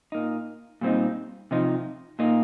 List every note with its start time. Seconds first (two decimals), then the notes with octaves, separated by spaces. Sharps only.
0.12 A#2 A#3 D#4
0.81 A#2 G3 C4 D#4
1.51 C3 F3 D#4
2.19 A#2 A#3 D#4